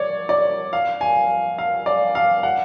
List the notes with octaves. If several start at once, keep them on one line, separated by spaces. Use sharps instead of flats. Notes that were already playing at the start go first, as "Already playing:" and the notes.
Already playing: C#5 D5
D5
F5
G#5
F5
D5
F5
F#5